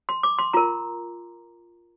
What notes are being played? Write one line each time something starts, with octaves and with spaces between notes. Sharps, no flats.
C6
D6
C6
F4 A#4 A#5